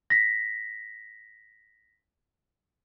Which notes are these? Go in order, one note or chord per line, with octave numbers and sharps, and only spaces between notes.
A#6 B6